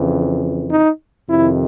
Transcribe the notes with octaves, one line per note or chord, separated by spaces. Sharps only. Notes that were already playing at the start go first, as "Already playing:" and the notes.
Already playing: F2 C#3 E3
D#4
F2 C3 D#3 E4